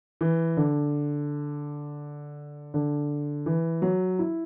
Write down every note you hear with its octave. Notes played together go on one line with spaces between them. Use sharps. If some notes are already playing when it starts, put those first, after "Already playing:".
E3
D3
D3
E3
F#3
E4